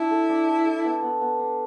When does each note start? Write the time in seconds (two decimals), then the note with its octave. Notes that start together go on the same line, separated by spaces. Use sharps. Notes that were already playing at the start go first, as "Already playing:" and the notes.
Already playing: D4 E4
0.11 A4
0.29 D4
0.48 A4
0.66 A4
0.84 B3
1.02 B3
1.21 B3
1.39 D4